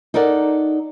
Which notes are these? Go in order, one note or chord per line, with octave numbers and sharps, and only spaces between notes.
D#4 A4 A#4 D5 F#5